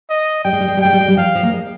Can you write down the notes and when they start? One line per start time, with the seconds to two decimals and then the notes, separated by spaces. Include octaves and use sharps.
0.10 D#5
0.45 G3 G5
0.53 G#3
0.60 G3
0.68 G#3
0.77 G3
0.81 G#3 G5
0.93 G3
1.01 G#3
1.08 G3
1.17 F3 F5
1.35 F3
1.43 A#3
1.53 G#3